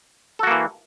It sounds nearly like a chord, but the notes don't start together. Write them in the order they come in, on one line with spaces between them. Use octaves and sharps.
A4 F#4 A#3 E3